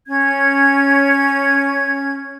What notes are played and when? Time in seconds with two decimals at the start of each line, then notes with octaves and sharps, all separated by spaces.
0.07 C#4 G#6